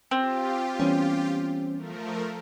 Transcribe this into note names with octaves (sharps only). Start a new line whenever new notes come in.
C4 F4 G4
E3 G3 B3 C#4
F3 A3 A#4